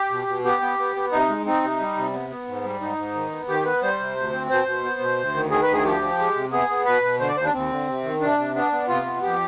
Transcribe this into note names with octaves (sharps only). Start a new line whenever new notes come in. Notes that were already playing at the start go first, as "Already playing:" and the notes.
Already playing: G4
B2
B2
B3 G4
B3
B3
B3
C3 D#4
G#3
C4 D#4
C3
G3
C3
B3
B3
G#2
G3
G#2 D#4
G#2
D#3
B3
D#3 G4
B3 B4
G3 C5
C3
D2
C4
B2 C5
B2
B3
B2
D2
D#3
D#3 G#4
B4
D2
G#4
F3 G4
F3
G#3
C3
B3 G#4
B3
B2 B4
B2
D3 C5
D5
D#2 C5
D4
D#2 C4
D3
C3
D#3
C3 D4
C3
B3 D4
B3
C3 F4
B3
F2 G4